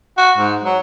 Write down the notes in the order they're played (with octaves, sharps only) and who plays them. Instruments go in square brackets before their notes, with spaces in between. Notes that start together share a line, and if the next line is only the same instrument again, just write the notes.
[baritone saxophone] F#4
G#2
F#3